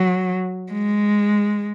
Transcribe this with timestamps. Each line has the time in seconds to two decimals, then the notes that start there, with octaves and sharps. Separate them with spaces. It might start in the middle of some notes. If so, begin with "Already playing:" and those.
Already playing: F#3
0.72 G#3